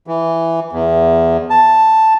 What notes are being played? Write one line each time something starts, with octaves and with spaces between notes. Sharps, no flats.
E3
E2
A5